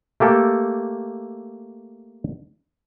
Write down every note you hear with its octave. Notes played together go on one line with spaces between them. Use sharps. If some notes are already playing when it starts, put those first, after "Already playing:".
A3 A#3 G4 A4